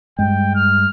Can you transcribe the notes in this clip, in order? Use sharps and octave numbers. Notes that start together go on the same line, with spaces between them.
G2 G#3 G5
F6